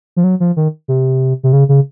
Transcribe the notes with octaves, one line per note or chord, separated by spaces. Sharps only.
F3
F#3
F3
D#3
C3
C3
C#3
C#3